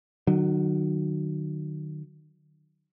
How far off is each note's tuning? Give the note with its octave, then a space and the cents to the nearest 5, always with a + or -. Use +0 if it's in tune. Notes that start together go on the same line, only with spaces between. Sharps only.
D#3 -45 F#3 +0